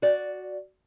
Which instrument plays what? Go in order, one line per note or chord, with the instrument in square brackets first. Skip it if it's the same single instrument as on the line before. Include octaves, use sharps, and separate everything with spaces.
[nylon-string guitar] F#4 D5